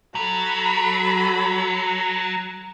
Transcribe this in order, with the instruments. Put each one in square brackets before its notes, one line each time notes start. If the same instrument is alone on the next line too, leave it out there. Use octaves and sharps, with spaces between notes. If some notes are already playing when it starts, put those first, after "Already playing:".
[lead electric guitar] F#3 [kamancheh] A4 B5